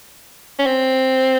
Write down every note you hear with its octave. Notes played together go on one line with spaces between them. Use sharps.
C#4
C4